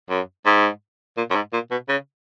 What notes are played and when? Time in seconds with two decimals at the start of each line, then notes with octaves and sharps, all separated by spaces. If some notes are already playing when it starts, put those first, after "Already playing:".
0.09 F#2
0.46 G#2
1.17 A#2
1.30 F#2
1.35 G#2
1.53 A#2
1.71 B2
1.89 C#3